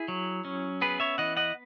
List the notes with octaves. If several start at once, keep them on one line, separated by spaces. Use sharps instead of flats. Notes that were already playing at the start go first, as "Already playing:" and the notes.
Already playing: E4 G#4
F#3
C#4
B3 G#4 B4
C#5 E5
E3 D#5 F#5
D#5 F#5